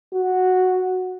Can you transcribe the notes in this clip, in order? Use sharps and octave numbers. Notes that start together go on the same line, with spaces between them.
F#4